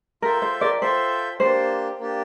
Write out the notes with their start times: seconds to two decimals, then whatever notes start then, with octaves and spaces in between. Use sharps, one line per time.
0.22 F4 A4 A#4 E5 G5
0.42 C5
0.61 A#4 D5
0.81 F4 A4 C5 E5 G5
1.40 A#3 D4 G4 C5
1.99 A#3 D4 G4